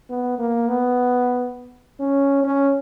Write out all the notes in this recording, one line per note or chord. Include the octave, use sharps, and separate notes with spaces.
B3
A#3
B3
C#4
C#4